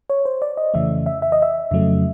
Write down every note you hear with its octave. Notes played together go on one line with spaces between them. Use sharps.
C#5
C5
D5
D#5
F2 C#3 E3 A3 E5
E5
E5
D#5
E5
F2 C#3 F#3 A3